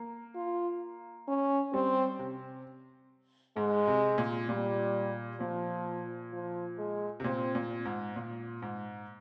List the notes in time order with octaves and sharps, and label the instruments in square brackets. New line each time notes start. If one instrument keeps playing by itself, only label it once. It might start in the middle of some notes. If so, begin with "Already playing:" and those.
Already playing: [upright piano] A#3
[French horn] F4
C#4
[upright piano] G3 [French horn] C4
[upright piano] C3
[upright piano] G#2 [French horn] G#3
[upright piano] C3
A#2
[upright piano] A#2 [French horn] G3
[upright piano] A#2 [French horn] F3
[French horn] F3
G#3
[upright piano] C3
[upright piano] A#2 [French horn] C4
[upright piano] A#2
G#2
A#2
G#2